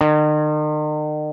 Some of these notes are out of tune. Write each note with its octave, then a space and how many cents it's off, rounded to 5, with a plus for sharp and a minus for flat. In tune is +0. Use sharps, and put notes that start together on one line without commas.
D#3 -45